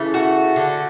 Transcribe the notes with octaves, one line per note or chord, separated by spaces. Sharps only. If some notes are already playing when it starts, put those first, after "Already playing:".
Already playing: C#3 E3 A3
F#4
D3 A3